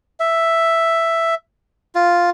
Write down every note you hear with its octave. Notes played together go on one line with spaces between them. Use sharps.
E5
F4